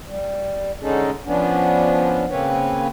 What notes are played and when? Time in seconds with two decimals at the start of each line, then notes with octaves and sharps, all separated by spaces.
0.06 G3
0.82 D3 G#3 C#4 D#4 G#4 A4
1.26 F3 B3 C#4 D4
2.30 C#3 A#3 C4 C#4 B4 C#5